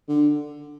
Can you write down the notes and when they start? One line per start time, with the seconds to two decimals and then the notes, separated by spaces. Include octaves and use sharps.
0.08 D3